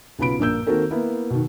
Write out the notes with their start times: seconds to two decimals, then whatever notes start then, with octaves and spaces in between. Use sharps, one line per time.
0.19 B1 C#3 B3 F4 B5 D7
0.39 A#1 G2 A#3 E6 G6
0.67 D#3 A#3 C4 F#4 A4 A#4
0.91 A#3 B3 E4
1.30 B2 D#3